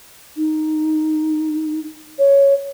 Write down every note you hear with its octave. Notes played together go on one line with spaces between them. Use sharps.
D#4
C#5